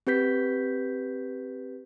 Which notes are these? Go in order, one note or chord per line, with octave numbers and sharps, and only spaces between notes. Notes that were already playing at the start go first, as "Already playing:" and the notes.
C4 G4 B4 G6 B6